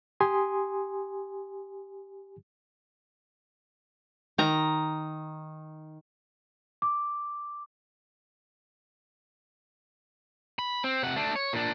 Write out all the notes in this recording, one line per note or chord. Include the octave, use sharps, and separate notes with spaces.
G4 G#5 C6 D#6
D#3 A#5
D6
B5
C4
C3 F#5
A3 D4
C#5
A#2 D4